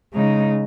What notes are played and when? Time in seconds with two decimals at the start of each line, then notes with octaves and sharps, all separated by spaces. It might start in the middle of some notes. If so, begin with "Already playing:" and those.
0.13 C#3 G#3 D#4